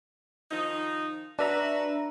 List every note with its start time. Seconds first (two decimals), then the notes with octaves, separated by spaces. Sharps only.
0.51 D#3 F3 D#4
1.39 D4 F#4 B4 E5 A#5